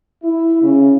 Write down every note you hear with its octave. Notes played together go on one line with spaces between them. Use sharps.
E4
C#3